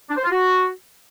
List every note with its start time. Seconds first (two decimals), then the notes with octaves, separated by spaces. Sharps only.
0.10 D4
0.17 C5
0.24 F4
0.32 F#4